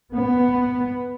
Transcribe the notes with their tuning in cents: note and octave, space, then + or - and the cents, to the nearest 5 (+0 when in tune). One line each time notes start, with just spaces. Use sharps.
B3 +5